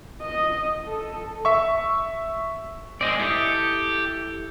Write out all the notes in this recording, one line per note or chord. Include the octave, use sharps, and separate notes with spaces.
D#5
A4
E5 C#6
G#3 C4 D5 D#5
E4 G4 A4 D#6